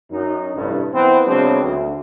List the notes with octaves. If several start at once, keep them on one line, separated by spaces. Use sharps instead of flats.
F#2 D#4
A1 G2 C3
E3 B3 C4
C#3 F#3 G#3 B3 C4 D4
D2